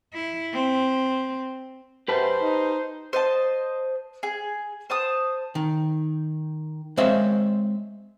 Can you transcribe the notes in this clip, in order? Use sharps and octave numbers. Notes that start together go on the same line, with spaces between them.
E4
C4
F#2 G4 B4 C5 A5
D#4
C5 D#5 A5
G#4
C5 A5 D#6
D#3
G#3 C4 C5 C#5 E5 F5